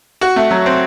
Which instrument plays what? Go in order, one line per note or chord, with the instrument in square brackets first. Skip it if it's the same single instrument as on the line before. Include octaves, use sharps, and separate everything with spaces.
[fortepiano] F#4
A3
F#3
C4